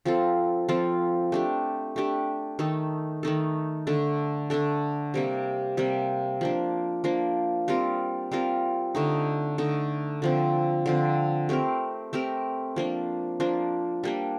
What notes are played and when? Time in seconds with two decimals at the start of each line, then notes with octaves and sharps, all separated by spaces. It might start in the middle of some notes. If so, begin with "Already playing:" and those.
0.05 F3 C4 F4 A4
0.69 F3 C4 F4 A4
1.32 A3 D4 G4
1.96 A3 D4 G4
2.59 D#3 A3 D#4 A4
3.23 D#3 A3 D#4 A4
3.87 D3 A3 D4 A4
4.50 D3 A3 D4 A4
5.14 C3 G3 A#3
5.77 C3 G3 A#3
6.41 F3 A#3 D4
7.04 F3 A#3 D4
7.68 G3 C4 F4 A#4
8.32 G3 C4 F4 A#4
8.95 D3 A3 D#4
9.58 D3 A3 D#4
10.22 D3 F3 C4
10.86 D3 F3 C4
11.49 A3 C4 G4 A#4
12.13 A3 C4 G4 A#4
12.76 F3 A#3 D4
13.40 F3 A#3 D4
14.04 G3 A#3 D4